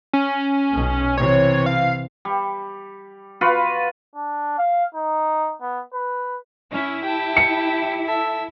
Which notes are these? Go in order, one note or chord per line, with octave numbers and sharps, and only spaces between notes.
C#4
B1 B2
C3 E3 C#5
F5
G3
F4 F#4 B4 B5
D4
F5
D#4
B3
B4
C#4 E4
G4 G5 A5
C#7
A4 E5